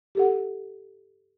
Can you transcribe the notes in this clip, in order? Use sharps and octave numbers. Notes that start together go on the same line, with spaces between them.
G4 A4 F#5